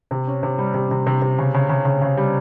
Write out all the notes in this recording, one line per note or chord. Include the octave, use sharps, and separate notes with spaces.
C3
C#4
C3
G3
C3
C3
C3
C3
C#3
C#3
C#3
C#3
C#3
G3